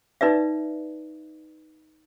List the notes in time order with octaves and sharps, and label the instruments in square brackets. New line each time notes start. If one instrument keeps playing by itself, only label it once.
[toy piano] D#4 B4 D5 E5